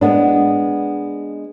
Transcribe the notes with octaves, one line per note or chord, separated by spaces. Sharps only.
G#3 B3 D4